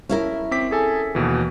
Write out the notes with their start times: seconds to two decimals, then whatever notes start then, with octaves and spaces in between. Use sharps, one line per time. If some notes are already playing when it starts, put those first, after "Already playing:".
0.09 C#4 E4 A#4
0.51 C4 D6 B6
0.71 G#4 A4 G#5
1.15 D#2 B2 E3